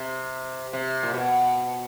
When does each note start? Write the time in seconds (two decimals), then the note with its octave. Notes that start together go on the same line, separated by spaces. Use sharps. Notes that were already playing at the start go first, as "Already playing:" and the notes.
Already playing: C3
0.73 C3
1.03 A#2
1.14 B2